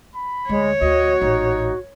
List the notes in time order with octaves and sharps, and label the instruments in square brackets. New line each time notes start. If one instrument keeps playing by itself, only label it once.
[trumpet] B5
[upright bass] D2 [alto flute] G#3 [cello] C#5
[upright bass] D2 [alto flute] F#4 [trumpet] D#5
[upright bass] A1 A#2 [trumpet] D#4